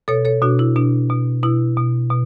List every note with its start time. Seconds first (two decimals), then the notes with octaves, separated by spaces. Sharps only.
0.08 B2 A4 C#5
0.25 A4 C#5
0.42 B2 D4 F#4
0.59 E4
0.76 B2 D4
1.09 B2
1.43 B2 E4
1.77 B2
2.10 B2